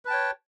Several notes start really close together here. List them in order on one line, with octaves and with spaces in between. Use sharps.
B4 A5 G5 C#5